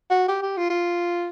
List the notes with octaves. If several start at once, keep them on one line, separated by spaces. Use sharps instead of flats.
F#4
G4
G4
F4
F4